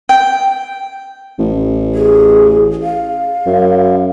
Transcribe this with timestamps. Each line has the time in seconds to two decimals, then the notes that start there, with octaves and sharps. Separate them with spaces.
0.09 G5
1.39 A1
1.95 G#4
2.83 F5
3.46 F#2